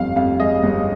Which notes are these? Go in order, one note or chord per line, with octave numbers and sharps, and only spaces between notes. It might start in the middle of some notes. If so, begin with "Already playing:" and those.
Already playing: G1 F2 F5
F2 F5
G#3 D#5
G1